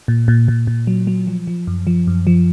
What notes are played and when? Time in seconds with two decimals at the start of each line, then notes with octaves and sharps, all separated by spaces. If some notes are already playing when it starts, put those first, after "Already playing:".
0.08 A#2
0.28 A#2
0.48 A#2
0.67 A#2
0.87 F#3
1.07 F#3
1.27 F3
1.47 F3
1.67 F#2
1.87 F3
2.07 F#2
2.27 F3